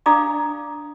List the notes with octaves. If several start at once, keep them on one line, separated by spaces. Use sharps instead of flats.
D4 D5 F5 A#5 D6 D#6